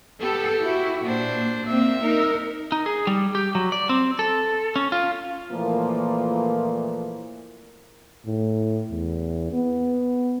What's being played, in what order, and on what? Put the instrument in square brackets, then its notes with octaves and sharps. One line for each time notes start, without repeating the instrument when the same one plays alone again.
[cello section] B3 A4 [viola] G4
[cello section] E4 F#4
[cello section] A#2 [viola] D4 C5
[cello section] A#3 C4 [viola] E5
[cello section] D#4 A#4
[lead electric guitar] D#4
G#4
G3
G4
F#3
D5
C4
A4
C#4
F4
[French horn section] A#2 E3 F3 A3 A#3
[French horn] A2
E2
B3